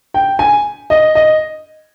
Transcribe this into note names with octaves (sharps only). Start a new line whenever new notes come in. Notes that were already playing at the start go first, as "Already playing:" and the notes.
G5
G#5
D#5
D#5